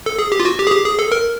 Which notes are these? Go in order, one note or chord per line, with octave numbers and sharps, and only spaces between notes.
A4
G#4
G4
F4
F#4
G4
G#4
G4
G#4
A4
A#4